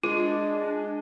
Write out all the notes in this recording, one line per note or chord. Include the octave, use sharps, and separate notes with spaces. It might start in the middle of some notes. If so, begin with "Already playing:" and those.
G#3 D4 F4